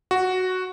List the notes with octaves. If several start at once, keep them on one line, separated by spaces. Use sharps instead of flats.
F#4